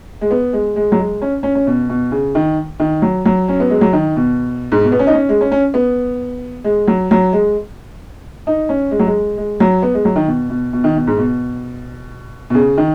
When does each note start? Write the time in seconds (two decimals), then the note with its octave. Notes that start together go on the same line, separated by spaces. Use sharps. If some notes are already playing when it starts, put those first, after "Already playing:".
0.21 G#3
0.31 B3
0.53 G#3
0.76 G#3
0.92 F#3
0.99 G#3
1.22 C#4
1.43 C#4
1.55 C#4
1.67 B2
1.89 B2
2.11 C#3
2.35 D#3
2.79 D#3
3.02 F#3
3.25 F#3
3.48 C#4
3.60 B3
3.70 G#3
3.81 F#3
3.93 D#3
4.16 B2
4.72 G#2
4.84 B2
4.92 B3
4.99 C#4
5.07 D#4
5.14 C#4
5.29 G#3
5.41 C#4
5.52 C#4
5.74 B3
6.64 G#3
6.87 F#3
7.11 F#3
7.33 G#3
8.47 D#4
8.69 C#4
8.91 G#3
8.99 F#3
9.06 G#3
9.38 G#3
9.60 F#3
9.82 B3
9.94 G#3
10.05 F#3
10.16 D#3
10.27 B2
10.50 B2
10.73 B2
10.84 D#3
10.96 B2
11.07 G#2
11.18 B2
12.50 B2
12.54 C#3
12.77 D#3